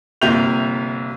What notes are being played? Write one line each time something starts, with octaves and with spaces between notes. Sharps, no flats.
G1 C3 A#3 E5 G6 F7